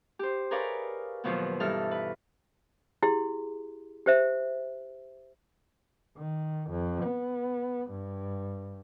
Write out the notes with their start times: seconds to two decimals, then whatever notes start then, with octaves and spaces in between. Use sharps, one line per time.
0.19 G4 C5
0.51 G#4 A#4 B4 C#5 D5 F5
1.24 D#2 B2 D#3 F3 F#3 B3
1.60 G2 E3 D#4 A4 F6
1.91 B4
3.02 E4 G4 G#4 C6
4.06 G4 C5 E5
6.18 D#3
6.71 F2
7.04 B3
7.91 G2